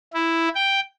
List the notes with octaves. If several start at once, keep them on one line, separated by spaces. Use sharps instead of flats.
E4
G5